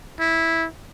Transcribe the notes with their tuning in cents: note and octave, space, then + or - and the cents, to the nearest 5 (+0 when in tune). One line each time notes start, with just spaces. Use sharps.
E4 -10